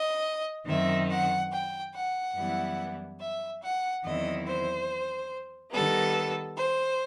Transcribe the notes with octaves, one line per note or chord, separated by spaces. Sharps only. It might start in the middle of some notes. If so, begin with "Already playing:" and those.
Already playing: D#5
F#2 D#3 F#3 C4 E5
F#5
G5
F#5
F#2 E3 G3 B3 E4
E5
F#5
E2 D#3 F#3 C4 E4 D#5
C5
D#3 G3 B3 A4
C5